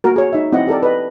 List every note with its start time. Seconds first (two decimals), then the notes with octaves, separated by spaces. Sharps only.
0.04 A#3 F#4 A#4
0.16 G#4 C#5
0.33 D#4 E5
0.52 C4 E4 D#5 F#5
0.67 G4 A4 A#4 D5
0.83 B4 D#5